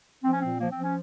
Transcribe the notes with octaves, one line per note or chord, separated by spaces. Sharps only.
F3 C4
C#4
A#2 C4
F3 A#3
C4
F3
C#4